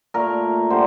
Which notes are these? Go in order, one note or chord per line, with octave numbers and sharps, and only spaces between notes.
A#2 A3 A#4
D3 G3 C5